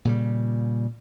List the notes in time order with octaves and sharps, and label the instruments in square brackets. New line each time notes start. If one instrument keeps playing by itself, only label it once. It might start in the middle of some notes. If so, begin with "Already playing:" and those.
[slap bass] A#2 C#3 G3